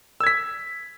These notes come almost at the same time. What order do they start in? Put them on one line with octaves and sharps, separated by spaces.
E6 G#6 B6